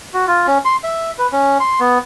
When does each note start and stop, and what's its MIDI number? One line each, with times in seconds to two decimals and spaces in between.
0.14 0.26 66
0.27 0.46 65
0.47 0.58 61
0.65 0.76 84
0.84 1.11 76
1.18 1.27 71
1.32 1.58 61
1.60 1.80 84
1.80 1.98 59